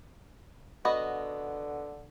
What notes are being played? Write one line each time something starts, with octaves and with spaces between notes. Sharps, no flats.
D3 B3 F#4 D#5